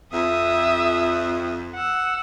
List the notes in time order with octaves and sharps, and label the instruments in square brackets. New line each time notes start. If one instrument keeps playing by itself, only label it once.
[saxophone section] F2 [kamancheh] E5 D#6
[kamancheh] F#5 E6